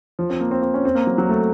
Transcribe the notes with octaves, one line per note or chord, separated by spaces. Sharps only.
F3
C4
A#3
C4
C4
C#4
C4
A#3
F#3
F#3
A3